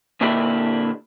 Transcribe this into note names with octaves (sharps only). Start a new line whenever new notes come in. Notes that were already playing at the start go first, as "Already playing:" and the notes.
A#2 D3 A#3 D4 E4 G4